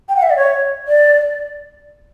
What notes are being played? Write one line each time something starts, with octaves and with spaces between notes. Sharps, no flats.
G5
F#5
E5
D5
C#5
D5